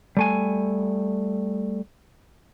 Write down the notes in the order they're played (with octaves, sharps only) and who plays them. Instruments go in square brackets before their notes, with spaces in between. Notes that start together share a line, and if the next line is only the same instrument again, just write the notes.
[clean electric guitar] G3 A3 G#5